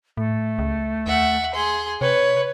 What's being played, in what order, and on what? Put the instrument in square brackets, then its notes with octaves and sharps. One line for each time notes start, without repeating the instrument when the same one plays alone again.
[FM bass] A2 [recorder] A3
[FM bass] C#2
[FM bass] D#2 [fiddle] E5 F#5
[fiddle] G#4 C6
[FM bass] C3 [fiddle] B4 [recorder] C#5